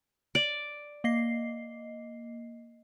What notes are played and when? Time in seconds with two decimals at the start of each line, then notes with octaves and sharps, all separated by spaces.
0.35 D5
1.04 A#3 D#5 C7